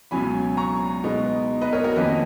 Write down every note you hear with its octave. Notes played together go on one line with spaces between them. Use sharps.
C#2 B2 F#3 C#4 G#5 B5
A#5 C#6
B2 G#3 B3 D#4
B4 D#5
A#4 C#5
F#4 A#4
F2 D#3 A#3 C#4 B4 D#5